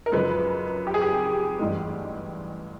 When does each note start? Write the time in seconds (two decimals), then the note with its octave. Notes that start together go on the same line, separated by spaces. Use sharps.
0.06 A#4
0.12 F#2 C#3 F3 G#3 B4
0.87 G4
0.94 G#4
1.01 G4
1.59 A1 G2 E3 G#3